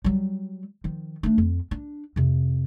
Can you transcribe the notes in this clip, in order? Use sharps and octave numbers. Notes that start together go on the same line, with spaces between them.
F#3 G3
D#3 F3
A3 D4
F2
D4
F2 C3